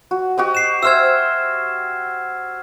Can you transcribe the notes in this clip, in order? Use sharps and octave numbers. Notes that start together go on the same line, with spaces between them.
F#4
F#4 G4 D#5
C7 E7
C5 E5 E6 F6 G#6